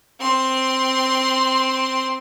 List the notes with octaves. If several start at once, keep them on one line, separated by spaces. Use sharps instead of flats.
C4 C6